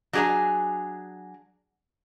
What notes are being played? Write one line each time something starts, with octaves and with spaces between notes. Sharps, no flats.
F#3 D4 G#4 C#5 A#5